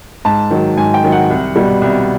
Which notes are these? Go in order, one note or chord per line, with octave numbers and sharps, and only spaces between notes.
G#2 A5
D#3 F#3
G#2 G#5
G5
D#3 F#3
F#5
C2
B2 G3
C2